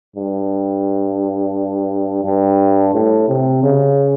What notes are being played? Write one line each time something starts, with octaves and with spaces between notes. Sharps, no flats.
G2
G2
A2
C3
C#3